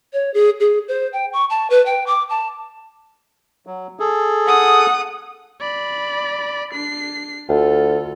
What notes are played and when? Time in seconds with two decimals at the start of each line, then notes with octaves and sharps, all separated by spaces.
0.13 C#5
0.34 G#4
0.60 G#4
0.88 C5
1.13 G5
1.33 C#6
1.50 A5
1.70 B4
1.86 G5
2.07 D6
2.30 A5
3.67 F#3
4.00 G#4 A4
4.46 F#5 D#6
5.60 D5 B5
6.73 D4 C7
7.49 D2 F4 A4